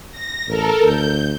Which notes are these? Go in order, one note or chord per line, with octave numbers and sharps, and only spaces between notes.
A#6
A1 A4 A#4
D2 G6